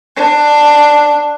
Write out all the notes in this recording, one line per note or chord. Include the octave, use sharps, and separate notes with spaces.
D4